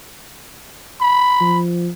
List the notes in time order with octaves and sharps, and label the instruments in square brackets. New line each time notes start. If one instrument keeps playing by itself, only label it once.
[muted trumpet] B5
[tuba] F3